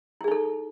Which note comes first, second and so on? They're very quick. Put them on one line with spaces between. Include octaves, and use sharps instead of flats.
E4 G#4 D#4 A4